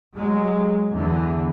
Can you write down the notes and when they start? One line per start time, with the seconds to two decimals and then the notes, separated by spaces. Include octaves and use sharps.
0.15 F#3 G#3
0.90 E2 D3 E3